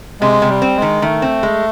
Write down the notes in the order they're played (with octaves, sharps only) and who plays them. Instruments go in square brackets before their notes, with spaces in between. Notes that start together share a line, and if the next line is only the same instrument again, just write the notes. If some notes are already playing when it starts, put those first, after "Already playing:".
[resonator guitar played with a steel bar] C3 [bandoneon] G#3
[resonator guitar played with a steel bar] C3
[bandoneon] G3
[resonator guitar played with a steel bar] C4
[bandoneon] G#3
[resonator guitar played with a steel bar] D#3
[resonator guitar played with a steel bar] D#3 [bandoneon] A3
[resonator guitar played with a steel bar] C4
G#3